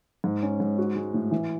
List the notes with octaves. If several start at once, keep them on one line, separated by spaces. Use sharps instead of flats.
G#2
C#4
G#2
F#4
G#3
A2
E3